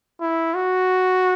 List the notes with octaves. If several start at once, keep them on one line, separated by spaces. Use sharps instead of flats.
E4
F#4